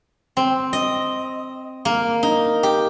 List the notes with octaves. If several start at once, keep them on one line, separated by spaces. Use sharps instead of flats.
C4
D#5
A#3
D#4
G4